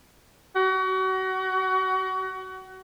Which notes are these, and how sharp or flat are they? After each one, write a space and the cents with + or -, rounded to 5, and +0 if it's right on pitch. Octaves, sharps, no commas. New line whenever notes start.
F#4 +30